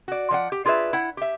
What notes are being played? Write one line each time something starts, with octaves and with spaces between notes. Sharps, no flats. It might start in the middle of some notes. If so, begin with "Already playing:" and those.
F#4 D5
F3 D5 F#5
G4
D4 F4 G#4 A#4 B4 E5
E4 F#5
G4 E5